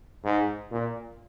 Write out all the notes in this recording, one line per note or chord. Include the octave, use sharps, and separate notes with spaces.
G#2
A#2